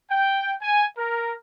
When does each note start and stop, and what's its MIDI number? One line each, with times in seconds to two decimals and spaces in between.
0.11 0.53 79
0.62 0.84 80
0.97 1.32 70